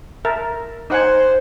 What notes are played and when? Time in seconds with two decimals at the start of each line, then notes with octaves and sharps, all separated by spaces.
0.25 A#4 E5 A5
0.90 D#4 C5 F#5 G#5